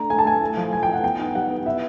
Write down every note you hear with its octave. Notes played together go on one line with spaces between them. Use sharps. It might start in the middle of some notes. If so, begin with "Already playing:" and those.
Already playing: A3 D4 A#5
A3 G#5
A5
A3 G#5
E4
F3
F3 G#5
E4 G5
F#5
B3 G5
D#4
G3 F#5
B3
E4 E5